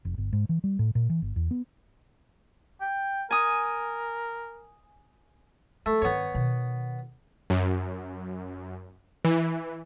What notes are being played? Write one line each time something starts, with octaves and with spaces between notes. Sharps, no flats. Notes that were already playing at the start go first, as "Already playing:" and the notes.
F1
G1
G#2
E3
G3
A2
A#2
E3
G1
E2
B3
G5
A#4 G#5 D#6
G3 A3
G2 D#3 B3 C#5
B2 D#3
F#2
E3